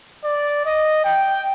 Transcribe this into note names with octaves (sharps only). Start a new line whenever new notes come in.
D5
D#5
G5